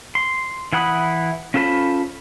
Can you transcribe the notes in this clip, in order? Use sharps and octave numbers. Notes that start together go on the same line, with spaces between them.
C6
E3 E4 F#5 B5 D#6
C#4 F4 A4 C5 B5